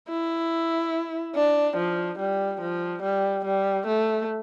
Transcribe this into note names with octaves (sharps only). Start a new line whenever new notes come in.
E4
D4
F3
G3
F3
G3
G3
A3